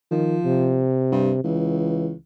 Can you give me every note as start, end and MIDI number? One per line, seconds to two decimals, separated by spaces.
0.11 0.38 51
0.11 0.87 53
0.45 1.44 48
1.12 1.33 43
1.44 2.13 37
1.44 2.14 52